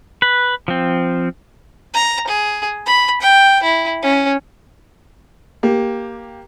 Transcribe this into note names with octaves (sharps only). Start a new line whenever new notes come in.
B4
F3 C4
A#5
G#4
B5
G5
E4
C#4
A#3 G4